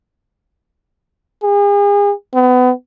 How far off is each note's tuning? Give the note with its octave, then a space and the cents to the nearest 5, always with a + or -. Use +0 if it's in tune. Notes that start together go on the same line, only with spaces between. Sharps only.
G#4 -40
B3 +30